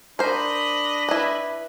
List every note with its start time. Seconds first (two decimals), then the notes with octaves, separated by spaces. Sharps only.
0.19 D4 A#4 C5 D#5 B5
1.09 E4 B4